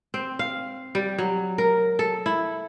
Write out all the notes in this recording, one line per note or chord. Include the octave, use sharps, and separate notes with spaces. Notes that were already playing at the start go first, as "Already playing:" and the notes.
C4
F5
G3
F#3
A#4
A4
E4